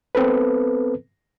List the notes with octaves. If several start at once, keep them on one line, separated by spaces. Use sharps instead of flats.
B3 C4 A4 B4